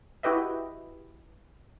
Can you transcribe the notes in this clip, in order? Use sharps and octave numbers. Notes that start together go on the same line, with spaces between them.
E4 F#4 G4 B4 D#5 E5